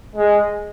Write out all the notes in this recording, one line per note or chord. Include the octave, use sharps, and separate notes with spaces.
G#3